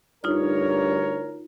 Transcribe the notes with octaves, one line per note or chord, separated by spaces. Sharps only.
D2 G2 D#4 F4 A#4 C#5 F6